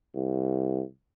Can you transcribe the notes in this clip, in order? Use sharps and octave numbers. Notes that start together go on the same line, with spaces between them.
C2